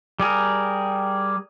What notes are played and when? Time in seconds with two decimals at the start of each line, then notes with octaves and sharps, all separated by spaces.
0.20 G3 G#4 A#4